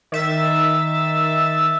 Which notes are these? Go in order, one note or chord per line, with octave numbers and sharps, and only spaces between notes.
D#3 E5 A6